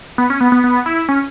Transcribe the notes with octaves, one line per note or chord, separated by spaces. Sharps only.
B3
C#4
B3
B3
B3
E4
C#4